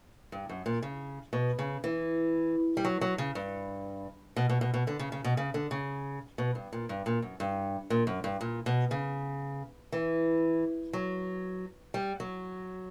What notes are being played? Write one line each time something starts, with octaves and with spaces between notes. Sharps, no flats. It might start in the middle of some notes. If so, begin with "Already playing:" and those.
G2
F#2
A#2
C#3
B2
C#3
E3
G3
F#3
F#3
C#3
G2
B2
B2
B2
B2
D3
C#3
C#3
B2
C#3
D3
C#3
B2
G2
A#2
G2
A#2
F#2
G2
A#2
F#2
G2
A#2
B2
C#3
E3
F#3
G3
F#3